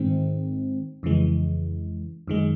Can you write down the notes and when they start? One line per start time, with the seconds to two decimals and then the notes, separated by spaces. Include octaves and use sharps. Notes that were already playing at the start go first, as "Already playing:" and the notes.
Already playing: G#2 D#3 G#3 C4
1.03 F2 C#3 E3 G#3
2.27 F#2 D#3 G#3